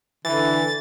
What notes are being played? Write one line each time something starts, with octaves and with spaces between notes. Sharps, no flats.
D3 E3 A6